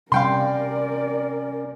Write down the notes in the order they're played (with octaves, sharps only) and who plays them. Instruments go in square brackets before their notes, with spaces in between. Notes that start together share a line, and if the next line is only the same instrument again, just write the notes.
[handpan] C3 G3 [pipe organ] C#4 [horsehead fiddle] A#4 D5 [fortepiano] F5 G5 C6